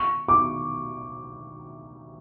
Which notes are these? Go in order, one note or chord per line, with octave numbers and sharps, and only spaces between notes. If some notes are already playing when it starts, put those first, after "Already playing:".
Already playing: C#6
D6